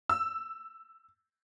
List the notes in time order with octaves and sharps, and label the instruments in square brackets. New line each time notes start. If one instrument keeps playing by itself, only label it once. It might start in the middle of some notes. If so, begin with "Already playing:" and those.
[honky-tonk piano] E6